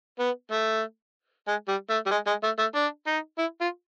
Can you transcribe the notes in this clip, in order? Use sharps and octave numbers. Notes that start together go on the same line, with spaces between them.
B3
A3
G#3
G3
A3
G3
G#3
G#3
A3
A3
D4
D#4
E4
F4